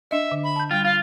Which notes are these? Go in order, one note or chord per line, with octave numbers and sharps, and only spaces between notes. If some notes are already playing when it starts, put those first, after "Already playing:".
D4 D#5 E5
D3
B5
A5 G6
G3 F4 G5
F4 F5